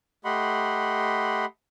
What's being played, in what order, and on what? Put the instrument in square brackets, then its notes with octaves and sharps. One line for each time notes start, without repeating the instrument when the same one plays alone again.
[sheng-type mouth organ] A3 G4 D#5 F#5 B5 C6